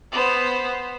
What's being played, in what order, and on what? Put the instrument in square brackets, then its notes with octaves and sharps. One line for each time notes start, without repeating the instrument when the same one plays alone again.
[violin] B3 C5